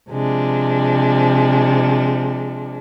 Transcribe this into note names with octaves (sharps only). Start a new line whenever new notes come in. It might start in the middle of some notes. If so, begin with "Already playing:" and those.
C3 F3 G#3 D4